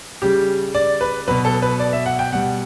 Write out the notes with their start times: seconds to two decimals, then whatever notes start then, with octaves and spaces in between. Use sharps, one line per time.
0.22 C#3 G3 G4
0.75 D5
1.01 B4
1.28 B2 F#3 B4
1.45 A4
1.62 B4
1.79 D5
1.93 E5
2.06 F#5
2.19 G5
2.32 B2 G3 F#5